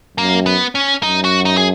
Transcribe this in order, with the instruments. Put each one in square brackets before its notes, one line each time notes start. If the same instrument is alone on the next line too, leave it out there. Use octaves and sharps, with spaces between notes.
[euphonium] F#2 [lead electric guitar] A#3
[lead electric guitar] B3
C#4
[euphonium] F#2 [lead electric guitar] D#4
[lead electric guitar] F#4
D#4
G#4